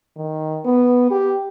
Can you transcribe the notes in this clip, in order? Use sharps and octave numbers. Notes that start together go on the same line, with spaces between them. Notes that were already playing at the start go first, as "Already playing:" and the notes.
D#3
B3
G4